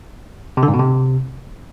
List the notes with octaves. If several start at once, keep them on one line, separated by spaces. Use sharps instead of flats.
C3
D3
G#2
B2
C3